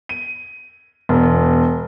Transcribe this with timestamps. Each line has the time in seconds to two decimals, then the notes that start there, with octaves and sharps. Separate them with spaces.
0.09 D#7
1.09 E1